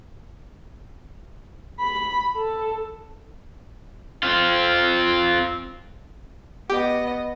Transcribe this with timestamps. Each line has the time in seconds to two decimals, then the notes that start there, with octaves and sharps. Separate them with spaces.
1.79 B5
2.36 A4
4.23 C4 F4
6.70 B3 G4 D#5